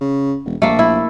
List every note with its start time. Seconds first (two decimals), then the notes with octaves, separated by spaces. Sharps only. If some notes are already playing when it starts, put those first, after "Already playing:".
0.01 C#3
0.45 E1
0.62 A#1 A3 A#3
0.79 E4